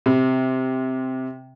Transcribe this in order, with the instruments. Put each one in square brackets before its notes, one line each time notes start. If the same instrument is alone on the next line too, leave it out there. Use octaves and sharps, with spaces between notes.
[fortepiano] C3